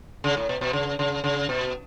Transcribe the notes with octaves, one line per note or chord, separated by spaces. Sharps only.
C#3
A2
B2
B2
C#3
C#3
C#3
B2